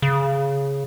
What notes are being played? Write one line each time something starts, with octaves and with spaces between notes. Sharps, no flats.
C#3